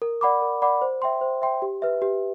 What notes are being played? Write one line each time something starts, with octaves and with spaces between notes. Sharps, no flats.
A#4
D5 F#5 B5 D6
A#4
D5 F#5 B5 D6
C5
E5 G5 C6
C5
E5 G5 C6
G4
B4 E5
G4